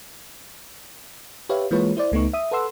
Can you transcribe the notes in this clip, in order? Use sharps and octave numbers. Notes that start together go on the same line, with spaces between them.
G4 B4 C#5 E5 F5
E3 G#3 A#3 F4 B4 C#5
E4 C5 D5
C#2 A3 B3 D#4 C#6
E5 D#6
A4 B4 F#5 C6 E6